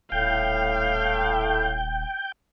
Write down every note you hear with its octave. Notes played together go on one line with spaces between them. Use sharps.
D#1 A2 F5 G5